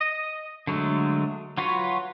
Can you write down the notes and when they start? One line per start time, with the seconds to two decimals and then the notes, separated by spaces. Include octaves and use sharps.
0.01 D#5
0.67 D3 F#3 G#3 A3
1.58 F#3 F4 F#4 B4 C#5